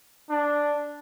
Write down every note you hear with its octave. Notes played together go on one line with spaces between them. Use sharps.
D4